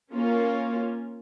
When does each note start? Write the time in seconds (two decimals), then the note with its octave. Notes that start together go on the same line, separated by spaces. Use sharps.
0.13 A#3 C#4 F4 A#4